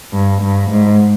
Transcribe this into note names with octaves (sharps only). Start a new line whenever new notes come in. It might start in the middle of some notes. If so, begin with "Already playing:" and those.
G2
G2
G#2